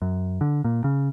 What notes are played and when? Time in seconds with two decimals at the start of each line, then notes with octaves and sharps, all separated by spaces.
0.02 F#2
0.41 D3
0.64 A#2
0.84 C#3